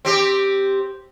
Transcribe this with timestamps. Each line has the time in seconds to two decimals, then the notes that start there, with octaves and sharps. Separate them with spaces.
0.05 C4 G4